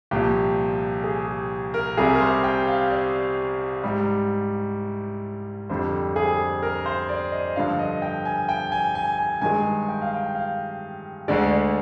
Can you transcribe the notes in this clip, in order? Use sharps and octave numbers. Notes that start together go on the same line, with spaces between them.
C2 A#2 F3 G4
G#4
G4
A#4
C2 C3 G3 G#4
A#4
C5
G5
F5
D5
G#2 G3
F2 D3 G3 C5
G#4
A#4
C5
D5
D#5
G2 D3 F3 F5
D#5
G5
G#5
G5
G#5
G#5
G#5
G2 D#3 G#3 G#5
G5
F5
G5
F5
D2 D3 G#3 D5
D5